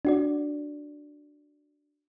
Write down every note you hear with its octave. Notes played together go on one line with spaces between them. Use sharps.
D4 F#4 D5